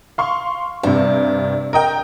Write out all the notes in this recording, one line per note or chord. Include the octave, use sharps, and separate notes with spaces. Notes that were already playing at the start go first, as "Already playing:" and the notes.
F5 C6 C#6
G2 C3 D4
A#4 D#5 G5